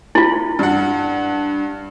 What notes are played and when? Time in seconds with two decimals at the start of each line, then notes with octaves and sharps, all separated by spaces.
0.15 E4 F4
0.59 G2 F#5